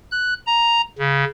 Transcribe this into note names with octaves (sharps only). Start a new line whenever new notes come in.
F#6
A#5
C#3